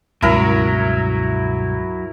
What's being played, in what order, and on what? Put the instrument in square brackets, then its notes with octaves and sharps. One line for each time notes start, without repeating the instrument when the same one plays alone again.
[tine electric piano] C#2 [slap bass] G2 B2 [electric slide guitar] F#3 [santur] E4 A#4 A#5